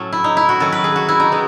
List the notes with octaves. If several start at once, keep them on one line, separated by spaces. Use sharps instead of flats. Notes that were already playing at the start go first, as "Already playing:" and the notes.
Already playing: A2 F#3 C#4 A4
E4
D#4
E4
F#4
D#3 F#3 C#4 A4
B4
G#4
F#4
E4
D#4
G#3 B3